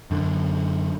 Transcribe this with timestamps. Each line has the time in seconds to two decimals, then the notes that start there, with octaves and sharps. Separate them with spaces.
0.11 F#2 D3